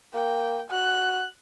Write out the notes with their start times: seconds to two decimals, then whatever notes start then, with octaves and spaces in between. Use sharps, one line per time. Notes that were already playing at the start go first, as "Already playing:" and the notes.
0.14 A#3 G5
0.71 F#4 F#6